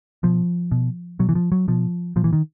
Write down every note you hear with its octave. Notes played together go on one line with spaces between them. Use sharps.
B2 F3
B2
B2 F#3
E3
F3
F#3
B2 F3
A#2 F3
E3
D#3